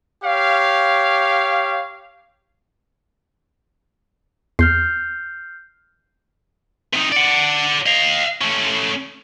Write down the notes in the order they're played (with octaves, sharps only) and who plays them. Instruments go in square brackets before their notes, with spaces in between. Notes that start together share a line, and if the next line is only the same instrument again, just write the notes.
[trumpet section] G4 C#5 F5
[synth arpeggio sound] E2 [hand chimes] F6 G6 C7
[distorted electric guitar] C3 D#4
D5 F#5
D#5 F5
A3 C#4